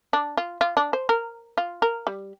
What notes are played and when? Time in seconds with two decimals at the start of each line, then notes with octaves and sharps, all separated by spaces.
0.13 D4
0.37 F4
0.61 F4
0.77 D4
0.93 C5
1.09 A#4
1.58 F4
1.82 A#4
2.07 G3